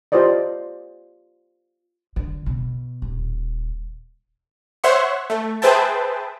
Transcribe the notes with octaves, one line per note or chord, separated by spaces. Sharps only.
F4 G4 C5 D5 D#5
D3
B2
D#1
C5 C#5 E5 F#5 C6 C#6
A3
G#4 B4 C5 E5 G5 A5